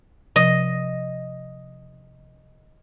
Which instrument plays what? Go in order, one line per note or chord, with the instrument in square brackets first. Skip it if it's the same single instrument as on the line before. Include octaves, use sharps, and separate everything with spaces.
[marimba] C3 F3 [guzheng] D#5